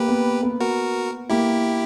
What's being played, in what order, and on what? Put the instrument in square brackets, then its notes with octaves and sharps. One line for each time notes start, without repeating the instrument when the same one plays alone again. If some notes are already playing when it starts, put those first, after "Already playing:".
Already playing: [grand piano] A#3 [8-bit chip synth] G4 B4
[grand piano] B3
B3
[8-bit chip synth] F#4 A#4
[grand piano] A#3 [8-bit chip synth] E4 G4